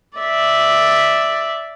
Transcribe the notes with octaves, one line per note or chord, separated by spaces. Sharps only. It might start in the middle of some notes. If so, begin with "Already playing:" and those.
D5 E5